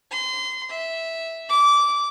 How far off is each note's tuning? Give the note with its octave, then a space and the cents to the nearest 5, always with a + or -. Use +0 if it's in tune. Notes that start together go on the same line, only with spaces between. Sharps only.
C6 -30
E5 -5
D6 -20